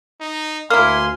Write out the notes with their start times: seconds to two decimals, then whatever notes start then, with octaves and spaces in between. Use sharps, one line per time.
0.20 D#4
0.70 D2 A#3 E4 F5 G#5 C6 F6